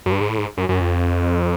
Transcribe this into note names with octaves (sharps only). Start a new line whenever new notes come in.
F#2
G2
G#2
A2
G#2
F#2
F#2
F2